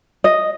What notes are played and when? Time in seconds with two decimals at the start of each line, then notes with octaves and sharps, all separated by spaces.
0.24 D#5